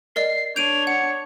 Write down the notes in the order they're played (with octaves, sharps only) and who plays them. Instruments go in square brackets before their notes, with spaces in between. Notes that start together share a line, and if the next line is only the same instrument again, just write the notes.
[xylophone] A#4 D5 D#5 [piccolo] C7
[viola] D4 [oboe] C#5 [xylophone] G6 D7 D#7 [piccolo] F7
[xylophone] F#5 [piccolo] C#7